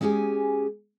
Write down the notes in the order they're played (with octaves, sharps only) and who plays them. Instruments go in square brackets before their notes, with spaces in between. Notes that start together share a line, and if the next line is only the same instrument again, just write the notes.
[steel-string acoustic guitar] G#3 C#4 G4 G#4 G#5